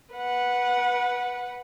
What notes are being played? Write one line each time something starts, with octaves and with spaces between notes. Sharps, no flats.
B4 F#5